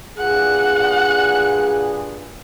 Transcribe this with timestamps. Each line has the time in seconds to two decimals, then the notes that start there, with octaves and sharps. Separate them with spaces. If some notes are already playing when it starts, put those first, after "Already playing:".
0.18 G2 A#2 G#4 F#5